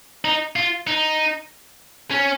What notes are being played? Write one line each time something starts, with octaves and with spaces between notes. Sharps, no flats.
D#4
F4
D#4
C#4